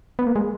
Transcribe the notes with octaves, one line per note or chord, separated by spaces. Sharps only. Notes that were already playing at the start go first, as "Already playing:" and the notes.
B3
A#3
G#3